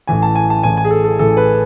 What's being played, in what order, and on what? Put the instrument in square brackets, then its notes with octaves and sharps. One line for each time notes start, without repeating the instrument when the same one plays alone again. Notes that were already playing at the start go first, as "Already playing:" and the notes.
[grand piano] A1 A2 E3 G#5
A5
G#5
A5
A1 A2 E3 G#5
G#5
G#4
A4
A4
A1 A2 E3 A4
B4